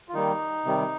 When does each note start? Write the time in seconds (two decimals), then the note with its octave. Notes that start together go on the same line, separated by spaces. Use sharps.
0.08 F4
0.13 D#3 G3 A#3 D#4
0.65 C3 D#3 G3